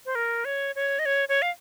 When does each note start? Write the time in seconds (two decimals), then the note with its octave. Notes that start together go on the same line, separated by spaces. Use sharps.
0.06 C5
0.15 A#4
0.45 C#5
0.76 C#5
0.99 D#5
1.06 C#5
1.29 C#5
1.42 F5